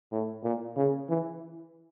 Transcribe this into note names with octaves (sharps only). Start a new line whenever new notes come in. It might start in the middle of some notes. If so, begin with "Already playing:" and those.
A2
A#2
C#3
E3